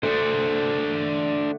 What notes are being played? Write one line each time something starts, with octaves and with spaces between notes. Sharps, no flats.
D3 A3 D4 C5